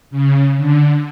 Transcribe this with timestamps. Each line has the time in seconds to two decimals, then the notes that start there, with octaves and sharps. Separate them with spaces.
0.11 C#3
0.57 D3